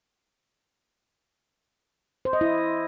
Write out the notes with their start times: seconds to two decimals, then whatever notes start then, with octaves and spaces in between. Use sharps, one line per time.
2.25 C5
2.33 D#5
2.41 E4